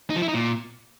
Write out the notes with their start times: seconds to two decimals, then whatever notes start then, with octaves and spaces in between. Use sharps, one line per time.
0.10 D#4
0.16 F3
0.22 E4
0.28 D#4
0.34 A#2